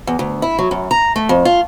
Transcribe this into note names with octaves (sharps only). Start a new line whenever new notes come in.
E2
D2
E4
F#3
F#2
A#5
A3
F2
F4